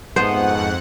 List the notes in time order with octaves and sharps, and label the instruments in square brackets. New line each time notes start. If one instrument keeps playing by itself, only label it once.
[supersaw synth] F2 F#5 [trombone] G#2 [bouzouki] F3 A3 B3 [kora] C5